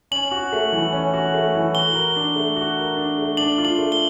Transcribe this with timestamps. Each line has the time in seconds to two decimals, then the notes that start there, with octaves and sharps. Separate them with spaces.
0.11 C#4 F#7
0.31 F#4
0.52 A3
0.72 E3
0.93 C#4
1.14 F#4
1.34 A3
1.55 E3
1.74 F#4 G7
1.95 A#4
2.16 D4
2.36 A3
2.56 F#4
2.77 A#4
2.97 D4
3.18 A3
3.37 D4 F#7
3.58 F4
3.65 F#7
3.78 A3
3.92 G7